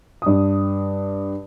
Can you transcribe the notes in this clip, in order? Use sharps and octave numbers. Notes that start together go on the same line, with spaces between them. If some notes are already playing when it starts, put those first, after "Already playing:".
G2 D#6